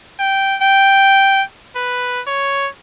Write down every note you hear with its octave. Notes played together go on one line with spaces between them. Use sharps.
G5
G5
B4
C#5